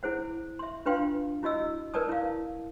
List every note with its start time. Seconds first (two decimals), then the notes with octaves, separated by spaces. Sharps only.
0.03 E4 G#4 C5 F#5
0.59 E5 C6
0.86 D4 F4 B4 F5 G5 C6
1.43 E4 F#4 D#5 E6
1.94 A#4 B4 D5 A5 D#6
2.09 E4 F5